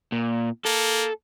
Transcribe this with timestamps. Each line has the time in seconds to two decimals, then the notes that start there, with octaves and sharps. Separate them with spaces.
0.12 A#2
0.65 A#3 A4